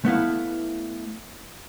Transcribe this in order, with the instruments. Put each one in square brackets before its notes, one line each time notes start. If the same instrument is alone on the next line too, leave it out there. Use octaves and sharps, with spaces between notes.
[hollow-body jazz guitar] A3 B3 E4 F5